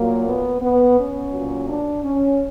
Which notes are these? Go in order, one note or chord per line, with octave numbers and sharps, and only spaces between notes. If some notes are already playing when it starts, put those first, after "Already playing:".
Already playing: A#2 F#3 A#3
B3
B3
C#4
A#2 F#3
D4
C#4